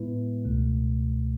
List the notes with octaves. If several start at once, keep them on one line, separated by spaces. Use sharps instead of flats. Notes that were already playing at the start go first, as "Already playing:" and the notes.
Already playing: A2 G#3 B3 E4 B4
C#2 B2 A3